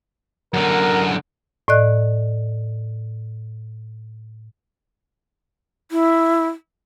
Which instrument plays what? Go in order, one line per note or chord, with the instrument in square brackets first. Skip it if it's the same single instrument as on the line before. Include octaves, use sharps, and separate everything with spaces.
[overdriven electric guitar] F#2 D3 [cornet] A#4
[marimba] A2 D5 D#5 F#6
[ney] E4